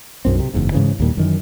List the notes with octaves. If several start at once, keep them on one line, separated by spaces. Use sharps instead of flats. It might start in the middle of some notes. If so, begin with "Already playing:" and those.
B1 F#2 C4
C3
F#1 E2 G#2
G#2 C#3 E3
D#2 A#2 G3
F#2 D#3 E3